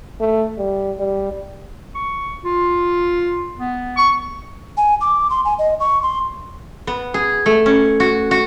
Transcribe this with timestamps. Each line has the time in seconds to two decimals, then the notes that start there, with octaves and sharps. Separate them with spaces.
0.21 A3
0.59 G3
0.99 G3
1.95 C#6
2.45 F4
3.58 B3
3.97 C#6
4.77 G#5
5.01 D6
5.30 C6
5.45 G#5
5.59 D#5
5.80 C#6
6.03 C6
6.87 B3
7.14 G#4
7.46 A3
7.66 C#4
8.00 F#4
8.31 F#4